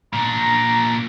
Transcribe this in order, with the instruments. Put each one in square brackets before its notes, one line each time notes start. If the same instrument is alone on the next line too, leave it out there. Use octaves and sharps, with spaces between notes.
[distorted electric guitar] A#2 D4 [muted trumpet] A#5